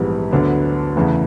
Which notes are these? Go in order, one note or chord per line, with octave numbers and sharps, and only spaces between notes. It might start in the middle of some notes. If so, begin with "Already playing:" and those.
Already playing: A#1 G#2 E3 G3 B3
D2 D3 F#3 B3
E2 C#3 E3 A3